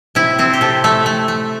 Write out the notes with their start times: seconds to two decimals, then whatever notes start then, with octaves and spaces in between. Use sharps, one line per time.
0.15 C3 E4
0.39 C3 C4
0.53 G4
0.61 C3 A4
0.84 A3 A4
1.06 A3
1.28 A3